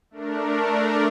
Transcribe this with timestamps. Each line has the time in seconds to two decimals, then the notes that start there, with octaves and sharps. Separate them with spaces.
0.11 A3 D4 A#4